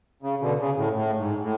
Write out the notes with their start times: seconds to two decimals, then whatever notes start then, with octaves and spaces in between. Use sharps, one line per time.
0.22 C#3
0.41 B2 D3
0.59 C#3
0.77 A2
0.95 A2
1.18 G#2
1.42 A2